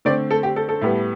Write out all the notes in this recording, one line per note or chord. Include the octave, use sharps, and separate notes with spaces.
D3 A3 C4 D5
A4
G4
A4
A4
A2 G3 B3